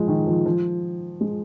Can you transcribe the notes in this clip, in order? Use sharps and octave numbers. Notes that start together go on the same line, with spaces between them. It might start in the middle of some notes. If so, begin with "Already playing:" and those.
Already playing: F3 G#3
D#3
F3
F3
G#3